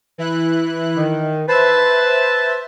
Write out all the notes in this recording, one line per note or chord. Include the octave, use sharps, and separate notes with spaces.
E3 E4 F#6
D#3
B4 C5 E5 A5